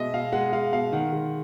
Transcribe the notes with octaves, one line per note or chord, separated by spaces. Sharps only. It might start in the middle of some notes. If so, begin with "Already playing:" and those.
Already playing: B2 G#3 D#5 E5
B2 F5
G#3 F#5
G#3 F5
B2 F5
D#3 F#5
G#3